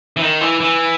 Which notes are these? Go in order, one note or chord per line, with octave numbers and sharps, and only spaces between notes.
E3
D#3
E3
E3